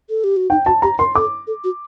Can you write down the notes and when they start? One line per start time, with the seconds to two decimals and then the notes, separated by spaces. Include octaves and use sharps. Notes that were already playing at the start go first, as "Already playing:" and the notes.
0.09 A4
0.24 G4
0.37 F#4
0.50 D#4 G5
0.66 F#4 A5
0.82 G4 A#5
0.99 A#4 C6
1.15 A4 D6
1.47 A4
1.64 F#4